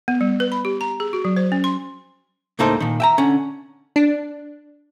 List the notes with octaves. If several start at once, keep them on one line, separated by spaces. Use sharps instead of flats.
B3
G3
B4
B5
G4
A#5
G#4
F#4
F#3
C5
C#4
C6
C#2 A2 A#3 D#4 A4 C5
A#2 D#3
E5 G5 A#5
D3 C#4
D4